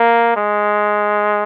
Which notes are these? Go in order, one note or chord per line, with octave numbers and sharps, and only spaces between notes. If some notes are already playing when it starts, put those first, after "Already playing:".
Already playing: A#3
G#3